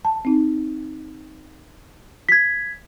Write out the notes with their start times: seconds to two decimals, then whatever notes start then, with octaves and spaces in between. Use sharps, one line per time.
0.05 A5
0.25 C4 D#4
2.29 G#6 B6